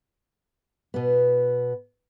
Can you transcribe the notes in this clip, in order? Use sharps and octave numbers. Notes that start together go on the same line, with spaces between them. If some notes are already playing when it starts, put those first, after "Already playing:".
B2 B3